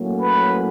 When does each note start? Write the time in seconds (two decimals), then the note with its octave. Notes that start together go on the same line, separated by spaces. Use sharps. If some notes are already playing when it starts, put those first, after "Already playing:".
Already playing: A2 F#3 A#3 C#4
0.21 B4